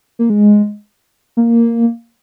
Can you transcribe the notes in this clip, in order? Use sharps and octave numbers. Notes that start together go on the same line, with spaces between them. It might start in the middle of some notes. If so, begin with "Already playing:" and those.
A#3
G#3
A#3